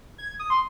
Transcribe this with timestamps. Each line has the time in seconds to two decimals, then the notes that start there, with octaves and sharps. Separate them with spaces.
0.18 G#6
0.39 D#6
0.50 C6